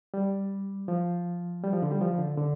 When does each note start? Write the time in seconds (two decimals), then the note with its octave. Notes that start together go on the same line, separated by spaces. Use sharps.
0.14 G3
0.88 F3
1.63 G3
1.73 F3
1.82 D3
1.92 G3
2.01 F3
2.19 D3
2.38 D3